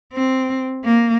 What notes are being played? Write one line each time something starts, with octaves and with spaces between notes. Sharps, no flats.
C4
A#3